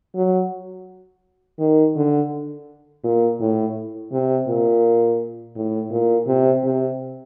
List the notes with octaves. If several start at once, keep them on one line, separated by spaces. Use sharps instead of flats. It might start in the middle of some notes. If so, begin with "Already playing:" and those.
F#3
D#3
D3
A#2
A2
C3
A#2
A2
A#2
C3
C3